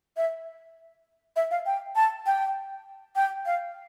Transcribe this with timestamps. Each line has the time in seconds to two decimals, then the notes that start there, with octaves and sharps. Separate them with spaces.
0.17 E5
1.36 E5
1.51 F5
1.66 G5
1.96 A5
2.26 G5
3.16 G5
3.46 F5